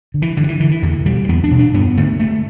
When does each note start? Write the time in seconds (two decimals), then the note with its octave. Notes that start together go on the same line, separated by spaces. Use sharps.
0.14 D3
0.22 E3
0.37 G2 D3
0.49 E3
0.60 D3 E3
0.71 E3
0.82 E2 D3
1.06 B2 G3
1.28 E2 B3
1.44 D4
1.51 B2
1.59 D4
1.74 G2 B3
1.97 D3 A3
2.20 G2 A3